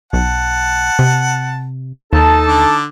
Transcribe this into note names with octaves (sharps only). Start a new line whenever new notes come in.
B1 F#5 A5
C3
D#2 D#4 A4 A5
D3 D6